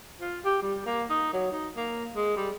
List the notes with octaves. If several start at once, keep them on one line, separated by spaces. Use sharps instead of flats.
F4
G4
G3
A#3
D#4
F#3
D#4
A#3
G#3
G3